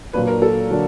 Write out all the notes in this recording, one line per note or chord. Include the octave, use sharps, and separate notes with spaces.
A#2 F#3 A#3 D4 B4
A#4
A4
D3 F#3 A#3 D4